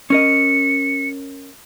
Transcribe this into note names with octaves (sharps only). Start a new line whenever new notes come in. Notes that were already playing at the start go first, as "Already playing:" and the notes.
C#4 A#4 D#5 C#7